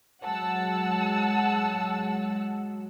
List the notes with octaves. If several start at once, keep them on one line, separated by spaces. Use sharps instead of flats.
F#3 G#3 F#5 A5 E6